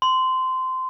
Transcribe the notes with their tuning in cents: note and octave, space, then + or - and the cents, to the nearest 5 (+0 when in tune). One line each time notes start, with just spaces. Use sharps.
C6 -20